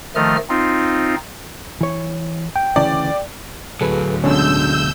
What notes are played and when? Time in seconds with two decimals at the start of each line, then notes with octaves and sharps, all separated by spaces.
0.15 D#3 F3 A3 D#5 F6
0.49 C4 D#4 F4
1.81 E3 C#5
2.56 G5
2.76 D2 C#3 E3 D5
3.81 D2 F#3 G#4 A4 B4
4.24 B2 D3 G#3 C#4 E6 G6